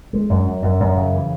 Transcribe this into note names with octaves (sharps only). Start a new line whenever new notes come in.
G#3
F#2
F#2
F#2
F#2
C#3
E3